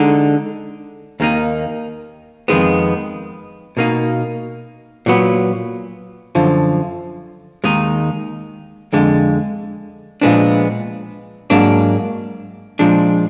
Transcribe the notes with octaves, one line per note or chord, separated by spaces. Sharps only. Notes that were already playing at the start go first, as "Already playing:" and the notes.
Already playing: D3 G#3 D#4
D#2 D#3 A#3 D#4
F2 D#3 G#3 B3
B2 A#3 D#4
A#2 F#3 B3
F#2 D3 F3
D#2 D#3 G#3 D#4
F2 D3 G#3
A#2 F3 G#3 B3 D4
G#2 F#3 A#3 D4
A#2 F3 G#3 D4